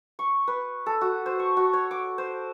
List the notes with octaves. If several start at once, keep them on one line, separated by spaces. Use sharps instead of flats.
C#6
B4
A4
F#4
C5
C#6
F#4
C#5
D6
C5